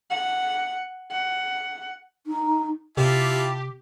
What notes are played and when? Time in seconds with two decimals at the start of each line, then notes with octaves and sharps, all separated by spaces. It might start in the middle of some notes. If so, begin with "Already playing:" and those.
0.11 F#5
1.11 F#5
2.26 D#4
2.97 C3 E4 F4 G4 A5